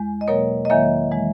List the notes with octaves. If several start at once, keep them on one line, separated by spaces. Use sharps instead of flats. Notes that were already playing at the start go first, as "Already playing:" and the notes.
Already playing: E2 G#3
D#5
B2 F#3 A#3 A#4 C#5
D#5
E2 D#3 F#3 A#3 C#5 E5
E3 G#3